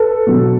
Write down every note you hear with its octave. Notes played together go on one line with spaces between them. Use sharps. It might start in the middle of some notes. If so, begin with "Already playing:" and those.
Already playing: A4 B4
B2 F#3